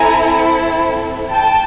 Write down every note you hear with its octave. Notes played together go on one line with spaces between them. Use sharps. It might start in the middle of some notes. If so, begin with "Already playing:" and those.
Already playing: C4 E4 A4 G#5 A#5
G5 A5